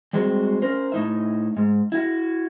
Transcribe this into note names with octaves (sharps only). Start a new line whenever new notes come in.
G3 G#3 C4 F#4
C#4 A#4 C5
A2 D#4 E5
G#2
E4 F#4